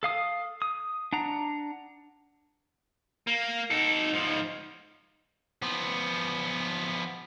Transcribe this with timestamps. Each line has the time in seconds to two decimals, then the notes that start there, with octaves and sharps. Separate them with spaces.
0.03 A4 F5 D#6
0.62 D#6
1.13 D4 F#5 A#5
3.27 A#3
3.70 D#4 A4
4.13 G#2 F3
5.62 F3 B3